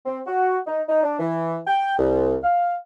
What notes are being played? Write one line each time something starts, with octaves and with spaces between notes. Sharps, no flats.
C4
F#4
D#4
D#4
D4
E3
G5
C2
F5